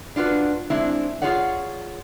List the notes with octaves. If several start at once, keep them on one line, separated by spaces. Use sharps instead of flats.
D4 F4 F#4 B4
G#3 C4 D4 E4
F4 G#4 C#5 D5 F#5